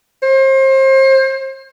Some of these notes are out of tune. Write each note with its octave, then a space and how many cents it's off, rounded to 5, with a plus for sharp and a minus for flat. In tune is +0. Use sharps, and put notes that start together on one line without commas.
C5 +35